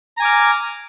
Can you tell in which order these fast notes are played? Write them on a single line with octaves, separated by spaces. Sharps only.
A#5 G#5 D6 F6